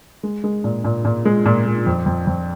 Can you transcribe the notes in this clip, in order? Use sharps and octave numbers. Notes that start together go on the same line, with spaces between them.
G#3
G#3
A#2
A#2
A#2
G#3
A#2
G#3
F2
F2
F2